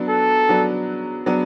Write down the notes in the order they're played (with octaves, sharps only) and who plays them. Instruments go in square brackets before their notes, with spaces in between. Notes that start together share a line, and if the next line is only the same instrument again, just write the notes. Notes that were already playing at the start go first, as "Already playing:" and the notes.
Already playing: [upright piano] F#3 B3 D4
[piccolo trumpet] A4
[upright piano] F#3 B3 D4
F#3 B3 D4